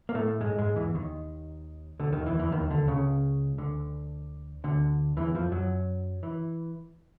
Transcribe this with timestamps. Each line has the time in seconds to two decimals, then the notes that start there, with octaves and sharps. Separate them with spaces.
0.09 A#3
0.14 A2 A3
0.41 G#2 G#3
0.58 G#2 G#3
0.76 E2 E3
0.94 D#2 D#3
2.00 D2 D3
2.13 D#2 D#3
2.26 E2 E3
2.39 E2 E3
2.52 D#2 D#3
2.70 D2 D3
2.87 C#2 C#3
3.58 D2 D3
4.64 D2 D3
5.17 E2 E3
5.35 F2 F3
5.52 F#2 F#3
6.23 E3